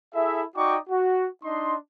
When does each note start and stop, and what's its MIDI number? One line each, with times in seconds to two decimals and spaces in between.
0.14 0.42 64
0.14 0.42 68
0.14 0.42 69
0.14 0.42 76
0.56 0.77 63
0.56 0.77 66
0.56 0.77 74
0.56 0.77 79
0.56 0.77 85
0.56 0.77 86
0.89 1.27 66
1.43 1.75 62
1.43 1.75 63
1.43 1.75 75
1.43 1.75 84